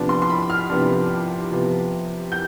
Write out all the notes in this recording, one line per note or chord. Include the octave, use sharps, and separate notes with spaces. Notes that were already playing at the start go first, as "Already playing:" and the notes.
Already playing: C3 F3 B3 D4
C6
C6
B5
F6
C3 F3 B3 D4
C3 F3 B3
G6